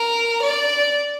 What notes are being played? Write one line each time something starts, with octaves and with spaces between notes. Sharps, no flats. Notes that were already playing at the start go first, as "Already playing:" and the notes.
Already playing: A#4
D5